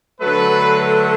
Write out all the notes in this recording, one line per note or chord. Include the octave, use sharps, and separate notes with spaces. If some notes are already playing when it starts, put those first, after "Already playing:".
D3 F#3 A3 A4 B4